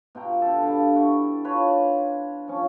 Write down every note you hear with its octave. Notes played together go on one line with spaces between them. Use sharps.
B2 F4 G5 A#5
D3 A4
G2 F5 A5 B5
E4 F#4 G5 C#6
D4 F4 B4 C#5
F3 C#4